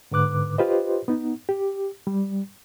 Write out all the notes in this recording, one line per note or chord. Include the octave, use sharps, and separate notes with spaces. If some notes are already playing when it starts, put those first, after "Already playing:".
G#2 D3 B4 D6 F#6
F4 G4 B4 C5 D#5
B3 D#4
G4
G3